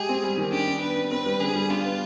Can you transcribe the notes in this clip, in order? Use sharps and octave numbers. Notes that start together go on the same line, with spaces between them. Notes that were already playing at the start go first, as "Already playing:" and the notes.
Already playing: G#3 G4 G#4
C4
G3
D#3
D4 G4
D4
B3 B4
D4
C4 B4
G3
D3 G#4
G3
D4 F4
B3